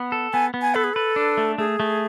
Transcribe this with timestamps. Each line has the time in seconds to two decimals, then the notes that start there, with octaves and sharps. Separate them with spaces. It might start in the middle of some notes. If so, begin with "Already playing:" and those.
Already playing: B3
0.12 A4
0.33 B3 G#5
0.54 B3
0.62 G#5
0.75 A4 B4
0.84 G#4
0.94 A4 B4
1.16 D4
1.37 A3
1.58 A3 G#4
1.80 A3